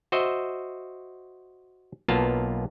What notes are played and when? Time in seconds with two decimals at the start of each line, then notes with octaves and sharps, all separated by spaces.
0.12 F#4 C5 D#5 E5
2.08 B1 A#3 B3 F4 A5